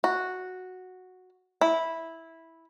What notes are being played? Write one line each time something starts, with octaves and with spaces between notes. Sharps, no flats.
F#4
E4